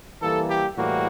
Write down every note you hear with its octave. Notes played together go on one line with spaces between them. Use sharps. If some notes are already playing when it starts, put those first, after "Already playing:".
E3 G3 A#3 A4
G4
A2 E3 G3 A#3 F#4